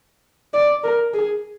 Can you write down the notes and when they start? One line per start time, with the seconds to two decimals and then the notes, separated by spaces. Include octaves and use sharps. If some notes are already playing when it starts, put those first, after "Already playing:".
0.54 D5
0.84 A#4
1.14 G#4